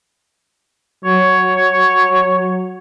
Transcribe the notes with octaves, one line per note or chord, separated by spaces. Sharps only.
F#3 C#5